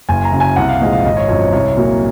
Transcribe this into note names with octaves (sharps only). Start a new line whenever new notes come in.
F#1 G#5
A#5
F#2 C#3
G#5
C2 F#5
F5
A#2 F3 G#3 D#5
F5
G#1 D#5
C#5
F#2 F3 C#5
C#5
C2 C#5
A#2 F#3 A#3